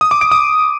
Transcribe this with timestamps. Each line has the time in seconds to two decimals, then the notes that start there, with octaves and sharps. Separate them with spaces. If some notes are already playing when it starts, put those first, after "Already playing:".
0.01 D#6
0.11 D6
0.21 D7
0.31 D#6